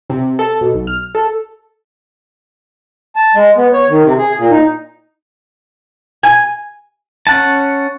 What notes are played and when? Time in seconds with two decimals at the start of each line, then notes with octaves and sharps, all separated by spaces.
0.10 C3
0.39 A4
0.61 B2
0.74 B1
0.87 F6
1.15 A4
3.16 A5
3.35 G#3
3.57 B3
3.74 C#5
3.89 D#3
4.03 C3
4.18 G#4
4.37 A#2
4.51 D#4
6.23 G#5
7.27 C#4 F#5 A5